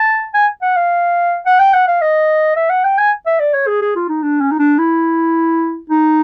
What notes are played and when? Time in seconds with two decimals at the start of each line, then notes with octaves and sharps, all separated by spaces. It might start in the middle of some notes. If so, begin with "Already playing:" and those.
Already playing: A5
0.34 G#5
0.62 F#5
0.76 F5
1.46 F#5
1.59 G5
1.73 F#5
1.88 F5
2.01 D#5
2.56 E5
2.70 F#5
2.84 G5
2.98 G#5
3.26 E5
3.40 D5
3.54 C#5
3.67 G#4
3.82 G#4
3.96 F4
4.09 D#4
4.23 D4
4.41 C#4
4.52 D#4
4.59 D4
4.79 E4
5.90 D#4